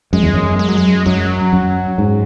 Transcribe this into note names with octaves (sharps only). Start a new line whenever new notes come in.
F#2 G#3
E2
F#2
G#3
F#3
G#3
F#2 F#3
F#2
G#2